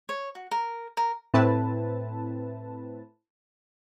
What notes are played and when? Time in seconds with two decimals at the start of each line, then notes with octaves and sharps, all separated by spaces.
0.09 C#5
0.35 F#4
0.51 A#4
0.97 A#4
1.34 A2 C4 E4 B4 A5